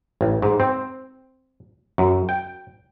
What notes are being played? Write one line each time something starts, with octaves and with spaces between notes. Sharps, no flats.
A1
G#2
C4
F#2
G5